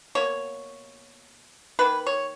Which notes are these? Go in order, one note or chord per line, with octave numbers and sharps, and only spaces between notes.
B2 A#3 C#5
D#3 A#3 B4
C#5